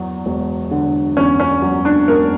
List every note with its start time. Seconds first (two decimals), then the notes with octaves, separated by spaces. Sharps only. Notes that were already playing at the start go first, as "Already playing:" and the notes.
Already playing: E2 F#3
0.26 E1
0.71 D3
1.17 E2 C#4
1.40 C#4
1.62 F#3
1.85 D4
2.08 E1 A#4